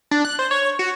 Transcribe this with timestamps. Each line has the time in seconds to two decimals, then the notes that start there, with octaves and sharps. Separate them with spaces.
0.11 D4
0.25 F#6
0.39 C5
0.51 C#5
0.79 F#4